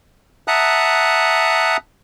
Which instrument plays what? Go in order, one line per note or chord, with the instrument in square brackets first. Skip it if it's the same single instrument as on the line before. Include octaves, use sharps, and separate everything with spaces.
[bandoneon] E5 F#5 A5 A#5 D#6 F#6